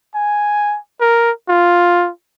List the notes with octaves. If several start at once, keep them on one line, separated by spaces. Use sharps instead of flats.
G#5
A#4
F4